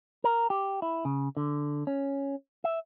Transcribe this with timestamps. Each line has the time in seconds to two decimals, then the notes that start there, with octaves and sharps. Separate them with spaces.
0.24 A#4
0.50 G4
0.82 E4
1.05 C#3
1.37 D3
1.87 C#4
2.64 E5